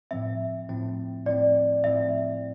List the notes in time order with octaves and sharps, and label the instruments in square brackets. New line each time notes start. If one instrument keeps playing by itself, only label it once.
[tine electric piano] A2 F3 C4 [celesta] E5
[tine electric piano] A2 F3 C4
[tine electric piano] A2 F3 C4 [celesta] D5
[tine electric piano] A2 F3 C4 [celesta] E5